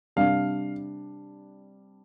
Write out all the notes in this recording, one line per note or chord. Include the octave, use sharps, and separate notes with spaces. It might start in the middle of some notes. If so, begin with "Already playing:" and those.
C3 G3 D4 F5